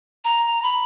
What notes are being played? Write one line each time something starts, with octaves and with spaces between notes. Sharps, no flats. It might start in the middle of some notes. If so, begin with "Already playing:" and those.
A#5
B5